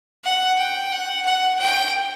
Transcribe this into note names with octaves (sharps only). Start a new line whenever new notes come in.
F#5
G5
F#5
F#5
G5